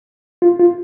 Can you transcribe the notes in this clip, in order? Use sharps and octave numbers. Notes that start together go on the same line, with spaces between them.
F4
F4